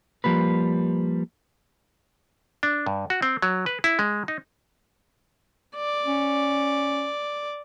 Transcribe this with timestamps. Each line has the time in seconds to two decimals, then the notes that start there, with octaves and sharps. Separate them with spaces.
0.24 F3 G3 A#3 B4
2.63 D4
2.86 G2
3.10 F#4
3.22 C4
3.42 F#3
3.66 B4
3.84 E4
3.99 G#3
4.28 D#4
5.77 D5
6.06 C#4